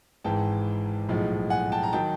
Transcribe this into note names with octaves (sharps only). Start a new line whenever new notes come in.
G#1 G#2 E3 G5 A5
B1 A2 F3 G#3
F#5 G#5
G5 A5
A#5
D#3 F#3 G5 A5